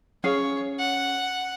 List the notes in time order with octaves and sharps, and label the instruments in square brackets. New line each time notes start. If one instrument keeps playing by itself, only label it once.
[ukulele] C#4 G#4 F5 [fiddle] C#5
[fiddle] F#5